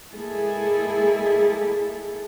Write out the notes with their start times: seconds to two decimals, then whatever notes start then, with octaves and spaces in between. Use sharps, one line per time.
0.12 G#3 A#3 E4 G#4 A4